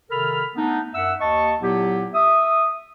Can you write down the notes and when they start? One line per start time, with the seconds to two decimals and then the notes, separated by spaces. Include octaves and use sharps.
0.10 C3 D#3 A4 A#4 B5 F6
0.56 A3 B3 D4 D#4
0.94 F#2 E5 F#5 E6
1.20 D#2 D#5 A5 C#6
1.61 A#2 F#3 B3 E4 G4
2.14 E5 D#6